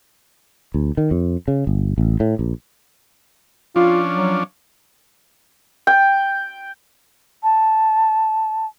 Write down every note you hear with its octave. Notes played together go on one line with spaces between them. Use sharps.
D2
D#3
F2
C#3
G1
A1
A2
A#1
F3 C#4 D4 F4
F#3
G5
A5